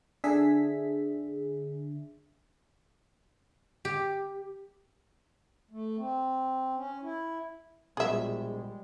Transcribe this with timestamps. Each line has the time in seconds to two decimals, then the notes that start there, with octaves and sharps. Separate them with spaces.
0.24 D3 D4 G#4 E5 B6
3.85 G4
5.71 A3
5.97 C4
6.76 C#4
7.02 E4
7.97 A#1 B2 G3 G#3 G#4 E5